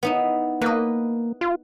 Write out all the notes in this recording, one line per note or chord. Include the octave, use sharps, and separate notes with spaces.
B3 D#4 E4
A#3 B4 D#5
F4